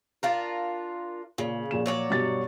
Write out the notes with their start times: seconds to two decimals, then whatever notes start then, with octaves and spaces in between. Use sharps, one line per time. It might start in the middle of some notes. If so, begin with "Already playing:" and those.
0.23 D4 F4 A#4
1.38 A#2 C#3
1.71 A#2 F3 E7
1.86 F#3 C#5 D5
2.10 G2 B2 A6